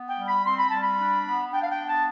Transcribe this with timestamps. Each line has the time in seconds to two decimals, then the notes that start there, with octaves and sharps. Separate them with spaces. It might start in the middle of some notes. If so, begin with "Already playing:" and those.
Already playing: B3
0.09 G5
0.18 G3
0.27 B5
0.45 C4 C6
0.58 B5
0.70 G3 A5
0.82 B5
0.98 D4
1.26 B3
1.52 D4 G5
1.62 F5
1.70 G5
1.78 B3
1.88 A5